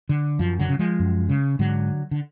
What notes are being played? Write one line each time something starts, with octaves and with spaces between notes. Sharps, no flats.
D3
F#2 F3
D3 F#3
C#3
F3 G#3
F#2
C#3
G#2 D3 F#3
D3